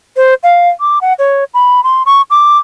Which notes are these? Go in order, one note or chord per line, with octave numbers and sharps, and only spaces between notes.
C5
F5
D6
F#5
C#5
B5
C6
C#6
D6